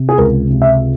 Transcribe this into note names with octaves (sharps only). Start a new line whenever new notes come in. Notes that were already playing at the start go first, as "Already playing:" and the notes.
Already playing: C3
G#4
C#2 A#4
C3
E5